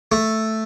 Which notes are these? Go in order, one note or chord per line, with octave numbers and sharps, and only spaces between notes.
A3